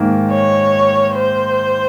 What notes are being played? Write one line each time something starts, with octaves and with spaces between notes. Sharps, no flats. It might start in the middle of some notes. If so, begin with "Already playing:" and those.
Already playing: G#2 D#3 A#3
C#5
C5